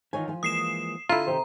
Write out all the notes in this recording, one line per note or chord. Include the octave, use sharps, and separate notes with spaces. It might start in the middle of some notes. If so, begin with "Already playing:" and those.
D#3 E3 D#4 F4 C#5 G#5
F3 G#5
E3 G#3 A#3 D#6 C7 E7
D3 E4 F4 A4 A#5
C3 D#3 D#4 G4 C5